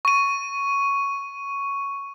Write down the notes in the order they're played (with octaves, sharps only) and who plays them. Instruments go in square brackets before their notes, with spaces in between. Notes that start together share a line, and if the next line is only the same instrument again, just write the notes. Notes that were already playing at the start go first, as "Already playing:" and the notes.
[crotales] C#6 D#7